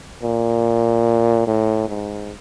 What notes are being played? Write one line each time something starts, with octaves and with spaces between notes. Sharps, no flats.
A#2
A2
G#2